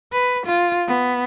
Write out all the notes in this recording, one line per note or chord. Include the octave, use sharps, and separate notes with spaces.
B4
F4
B3